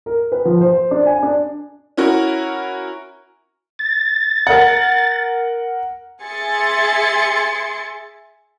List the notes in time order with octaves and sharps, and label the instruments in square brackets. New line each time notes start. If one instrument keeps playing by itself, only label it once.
[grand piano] A#4
B4
F3
C5
D4
G#5
D4
[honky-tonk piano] C#4 E4 F#4 A#4
[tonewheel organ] A6
[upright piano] A#4 F#5
[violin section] G#4 E5 G#5 C6 A6 C#7